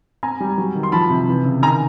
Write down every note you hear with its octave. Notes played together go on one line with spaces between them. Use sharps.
C4 G#5 A#5
G3
F#3
D#3
C6
F3 A5 B5
C3
E3
C#3
D#3 G#5 A#5